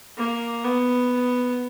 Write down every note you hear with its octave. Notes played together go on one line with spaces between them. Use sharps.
A#3
B3